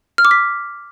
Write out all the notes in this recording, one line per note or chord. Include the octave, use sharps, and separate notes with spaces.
F6
D6
B6